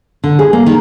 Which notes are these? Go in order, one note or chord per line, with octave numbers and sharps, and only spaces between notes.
D3
G#4
A#3
D#3